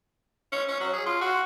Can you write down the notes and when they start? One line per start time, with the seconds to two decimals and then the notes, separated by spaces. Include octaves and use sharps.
0.52 C#4
0.68 C#4
0.80 F#3
0.93 G#4
1.06 F4
1.21 F#4